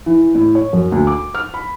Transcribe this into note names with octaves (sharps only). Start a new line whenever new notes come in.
E3
A2
C#5
F#2
D2
D6
F6
B5